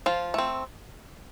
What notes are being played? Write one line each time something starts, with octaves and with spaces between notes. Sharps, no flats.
F3 F4
A3 C4